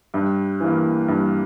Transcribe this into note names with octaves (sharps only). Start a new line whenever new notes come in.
G2
E3 A#3
G2